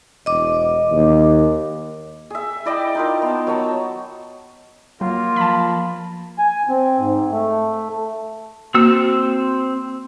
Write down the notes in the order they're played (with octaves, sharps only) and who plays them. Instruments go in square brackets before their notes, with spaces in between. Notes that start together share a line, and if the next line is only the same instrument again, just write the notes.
[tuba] E1 [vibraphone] D#5 D6
[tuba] D#2
[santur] G#4 E5
E4 D5 D#5 G5
D#4 F4 A#4
B3 A5
F#3 C#5 A5
[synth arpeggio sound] F#3 [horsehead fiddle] A#3 [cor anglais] F4
[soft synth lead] F3 [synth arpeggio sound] A5 B5
[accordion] G#5
C4
G#2
A3
[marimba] A#3 F#4 [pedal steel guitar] C4 E6